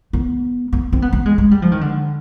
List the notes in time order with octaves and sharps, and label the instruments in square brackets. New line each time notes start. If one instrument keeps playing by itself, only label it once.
[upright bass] B3
B3
C4
B3
B3
G#3
G#3
G3
F3
D#3
D3